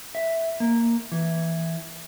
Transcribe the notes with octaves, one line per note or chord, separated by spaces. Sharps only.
E5
A#3
E3